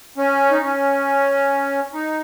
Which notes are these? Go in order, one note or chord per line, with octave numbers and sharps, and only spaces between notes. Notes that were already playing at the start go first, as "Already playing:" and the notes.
C#4
D#4
C#4
D#4